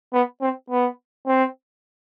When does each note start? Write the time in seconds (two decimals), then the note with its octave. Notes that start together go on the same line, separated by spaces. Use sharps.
0.14 B3
0.41 C4
0.70 B3
1.27 C4